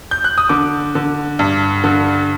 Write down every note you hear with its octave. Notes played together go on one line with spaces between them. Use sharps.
G6
F#6
D#6
D3 D6
D3
G2
D3